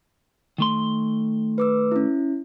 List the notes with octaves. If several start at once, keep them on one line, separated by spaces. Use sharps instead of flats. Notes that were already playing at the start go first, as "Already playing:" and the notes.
D#3 A3 C6
B4 D6 E6
C#4 E4